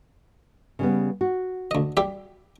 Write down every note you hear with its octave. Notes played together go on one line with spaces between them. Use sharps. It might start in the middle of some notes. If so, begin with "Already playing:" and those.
C#3 G3 B3
F#4
D2 D#5
G3 G4 E5